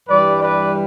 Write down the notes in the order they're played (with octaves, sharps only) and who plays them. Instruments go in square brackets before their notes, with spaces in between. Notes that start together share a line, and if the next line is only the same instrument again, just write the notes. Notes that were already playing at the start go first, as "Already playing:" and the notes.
[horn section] G2 E3 G3 B4 D5
B4 D5